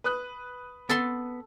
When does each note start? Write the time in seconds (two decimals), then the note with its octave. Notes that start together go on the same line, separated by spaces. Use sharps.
0.04 B4 D#6 F#6
0.89 B3 A4 A5 C6